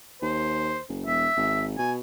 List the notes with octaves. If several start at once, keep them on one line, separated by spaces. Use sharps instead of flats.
D#2 C5
F#1
E1 E5
G#1
B2 G#5